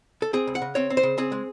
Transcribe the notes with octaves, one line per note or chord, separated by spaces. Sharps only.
A4
C4 G#4
C#2
F#5
C#3
C4 C#5
C4
C5
C#3
C4 G#4
G#3